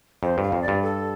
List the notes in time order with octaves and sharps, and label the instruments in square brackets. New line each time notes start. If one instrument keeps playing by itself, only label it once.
[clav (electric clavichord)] F2 [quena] C5
[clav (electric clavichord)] G2
[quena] F5
[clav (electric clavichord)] F2
[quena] D5
[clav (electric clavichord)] G2
[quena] A4